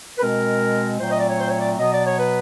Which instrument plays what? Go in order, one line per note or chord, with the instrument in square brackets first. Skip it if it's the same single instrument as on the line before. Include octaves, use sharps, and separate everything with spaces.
[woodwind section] B4
B2 G#3 C4 A#4
A#2 F#3 A3 C4 C5
D#5
D5
C#5
C5
C#5
D5
B2 F#3 B3 D#5
D5
C#5
B4